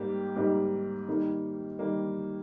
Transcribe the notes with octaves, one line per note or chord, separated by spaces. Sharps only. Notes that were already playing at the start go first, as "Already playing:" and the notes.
Already playing: G#2 G3 A#3 G4
G#2 G3 A#3 D#4 G4
D#3 G3 A#3 D#4
D#3 G3 A#3 D#4